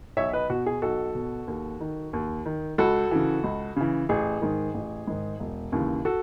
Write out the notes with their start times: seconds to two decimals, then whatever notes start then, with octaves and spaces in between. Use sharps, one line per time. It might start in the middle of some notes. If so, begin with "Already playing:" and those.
0.17 B1 C#5 E5
0.33 B4 D#5
0.50 B2 F#4
0.66 G#4
0.82 B1 F#4 A4
1.15 B2
1.47 D#2
1.80 D#3
2.13 D#2
2.46 D#3
2.78 C#2 F#4 A4
3.11 C#3 E3
3.44 C#2
3.76 C#3 E3
4.09 A1 G#4
4.42 G#2 D#3
4.74 A1
5.07 G#2 D#3
5.40 E1
5.72 D#2 C#3 E3
6.05 F#4 A4